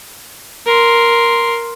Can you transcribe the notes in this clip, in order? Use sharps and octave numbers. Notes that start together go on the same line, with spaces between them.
A#4 C6